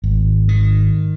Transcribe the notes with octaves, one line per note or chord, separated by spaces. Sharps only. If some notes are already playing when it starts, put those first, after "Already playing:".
G#1
D#3